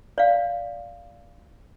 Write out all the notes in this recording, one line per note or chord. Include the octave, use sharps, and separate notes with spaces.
D5 F5